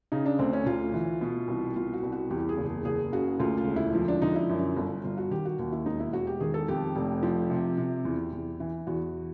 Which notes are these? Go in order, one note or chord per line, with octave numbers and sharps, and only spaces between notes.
C#3 D#4
D4
D2 C4
C#4
D2 F4
E3
B2
C2
B2 F4
F#4
C2
F#4
E2 G4
G#4
F#1
G#4
F#1 G#4
C#3 F#4
D2 F4
F4
E1
E4
F3
D4
D3 D#4
E4
F#2
G1
G1 F4
F#4
D#3 G4
F#4
D#2 F#4
E4
E1 D#4
E4
E1 F#4
G4
D#3 G#4
A4
F2 G4
F1
F3
C3
C3
E2
E2
E3
E2 F#4